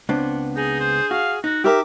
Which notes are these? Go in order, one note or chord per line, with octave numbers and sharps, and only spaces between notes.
C#2 B3 C4 D4
D#4 G#4
C5
F#4 F5
D#4 F#4
G4 A#4 E5 A#5 D6